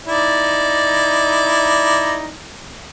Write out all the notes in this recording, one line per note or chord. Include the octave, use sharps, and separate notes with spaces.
D#4 E4 D5